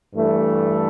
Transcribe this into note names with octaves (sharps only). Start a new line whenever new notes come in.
G2 E3 A3